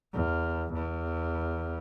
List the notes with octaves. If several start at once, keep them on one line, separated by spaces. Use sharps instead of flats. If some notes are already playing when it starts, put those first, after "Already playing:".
E2
E2